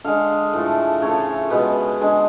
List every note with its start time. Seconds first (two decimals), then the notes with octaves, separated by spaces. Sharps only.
0.04 D3 G#3 F5
0.53 A2 F3 A3
1.02 C#3 F3 A3 C#5
1.50 B2 G#3 B4
2.00 D3 G#3